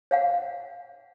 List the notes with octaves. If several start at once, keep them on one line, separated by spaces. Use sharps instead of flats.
C#5 F5 F#5